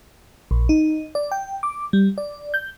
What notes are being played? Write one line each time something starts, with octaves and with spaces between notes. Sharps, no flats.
A#1
D#4
D5
G5
D6
G3
D5
G6